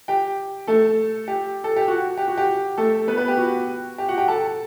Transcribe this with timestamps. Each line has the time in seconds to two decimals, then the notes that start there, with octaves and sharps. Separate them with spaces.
0.08 G4 G5
0.67 A3 A4
1.28 G4
1.64 A4
1.76 G4
1.88 F#4
2.17 G4
2.28 F#4
2.37 G4
2.77 A3 A4
3.08 B3 B4
3.18 B3 B4
3.28 G4
3.38 F#4
3.98 G4
4.08 F#4 F#5
4.18 G4 G5
4.28 A4 A5